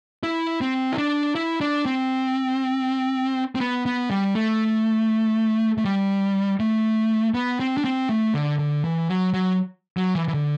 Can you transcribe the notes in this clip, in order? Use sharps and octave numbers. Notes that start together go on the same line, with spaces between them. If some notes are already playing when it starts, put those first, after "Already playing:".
E4
C4
E4
D4
E4
D4
C4
C4
B3
B3
G3
A3
A3
G3
A3
B3
C4
D4
C4
A3
D3
D3
E3
F#3
F#3
F#3
E3
E3
D3